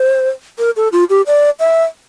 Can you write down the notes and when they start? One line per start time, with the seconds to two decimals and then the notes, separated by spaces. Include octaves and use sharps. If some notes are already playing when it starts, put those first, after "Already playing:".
Already playing: C5
0.59 A#4
0.76 A4
0.92 F4
1.10 G4
1.26 D5
1.60 E5